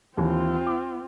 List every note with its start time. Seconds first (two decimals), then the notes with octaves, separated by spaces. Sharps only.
0.17 D#2 E3 C4 F4
0.67 D6